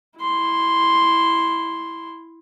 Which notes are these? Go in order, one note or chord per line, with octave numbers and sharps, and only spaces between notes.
E4 C6